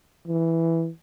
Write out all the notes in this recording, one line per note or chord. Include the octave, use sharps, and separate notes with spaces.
E3